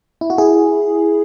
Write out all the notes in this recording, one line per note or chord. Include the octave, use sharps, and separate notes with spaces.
E4
F#4
E4 G#4